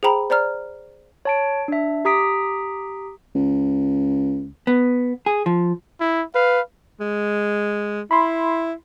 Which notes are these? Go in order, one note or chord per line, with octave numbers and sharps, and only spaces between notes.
G#4 C5 G5 A#5 B5
C5 D5 A#5 F6
C#5 A5 D7
D4 E5
G4 A#5 D#6 B6 D7
C#2
B3
G#4
F3
E4
B4 F5
G#3
E4 B5 C6